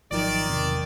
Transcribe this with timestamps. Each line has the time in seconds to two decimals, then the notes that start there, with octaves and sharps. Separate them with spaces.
0.11 G#1 D#3 F3 F#3 D5
0.49 E2 C3